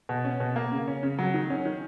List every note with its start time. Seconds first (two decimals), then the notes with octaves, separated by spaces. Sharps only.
0.09 B2
0.25 C#4
0.40 B2
0.56 A#3
0.72 C#3
0.88 C#4
1.03 C#3
1.19 F#3
1.34 D#3
1.50 C#4
1.65 D#3